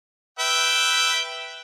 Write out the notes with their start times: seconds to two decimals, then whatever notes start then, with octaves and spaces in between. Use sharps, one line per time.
0.39 B4 E5 G5